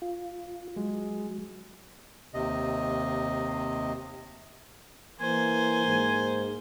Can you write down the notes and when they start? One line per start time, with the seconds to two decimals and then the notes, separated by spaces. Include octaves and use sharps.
0.02 F4
0.76 F#3 G#3
2.34 D#2 C3 D#5
5.21 E3 A#3 C5 G#5
5.87 G#2